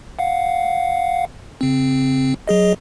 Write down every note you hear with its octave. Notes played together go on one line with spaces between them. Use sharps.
F5 F#5
C#3 C4
F#3 G#4 D#5